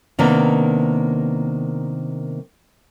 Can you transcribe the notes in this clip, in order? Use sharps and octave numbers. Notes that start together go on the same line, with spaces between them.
C3 D#3 A#3 B3 D4